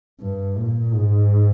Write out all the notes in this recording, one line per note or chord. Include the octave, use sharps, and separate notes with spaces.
G2
A#2
G#2